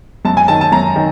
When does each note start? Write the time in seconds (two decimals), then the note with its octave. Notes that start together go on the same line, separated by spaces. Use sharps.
0.25 F#2 A5
0.37 G#5
0.48 D#3 A5
0.61 A5
0.72 F#2 A#5
0.96 D#3